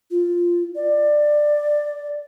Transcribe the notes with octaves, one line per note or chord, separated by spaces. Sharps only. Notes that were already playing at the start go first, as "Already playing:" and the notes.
F4
D5